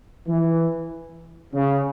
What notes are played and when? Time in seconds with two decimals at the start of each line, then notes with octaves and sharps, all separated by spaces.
0.27 E3
1.54 C#3